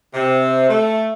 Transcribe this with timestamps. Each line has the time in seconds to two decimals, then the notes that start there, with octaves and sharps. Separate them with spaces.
0.14 C3
0.69 A3